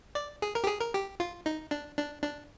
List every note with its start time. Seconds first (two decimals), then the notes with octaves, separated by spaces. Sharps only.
0.15 D5
0.42 G#4
0.55 A#4
0.64 G4
0.67 G#4
0.80 A#4
0.94 G4
1.20 F4
1.46 D#4
1.71 D4
1.98 D4
2.23 D4